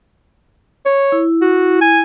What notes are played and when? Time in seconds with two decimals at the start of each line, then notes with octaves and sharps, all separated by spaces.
0.86 C#5
1.12 E4
1.42 F#4
1.81 G#5